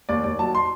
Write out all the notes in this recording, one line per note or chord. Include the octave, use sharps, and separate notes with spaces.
D#2 D5
D#2 D5
F#3 A5
C6